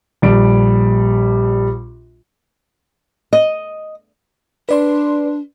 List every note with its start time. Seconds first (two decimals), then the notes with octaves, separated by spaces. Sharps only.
0.22 A#1 G3 D7
3.33 D#5
4.69 D4 B4 D5 C6